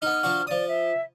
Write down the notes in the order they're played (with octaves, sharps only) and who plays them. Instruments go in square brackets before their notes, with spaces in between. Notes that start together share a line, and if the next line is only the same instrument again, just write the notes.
[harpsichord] B3 D#4 [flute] F6
[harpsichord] F3 D4 F#4
[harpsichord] F3 D#6 [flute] D5
[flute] E5